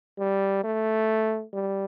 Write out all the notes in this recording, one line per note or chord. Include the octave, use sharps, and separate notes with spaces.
G3
A3
G3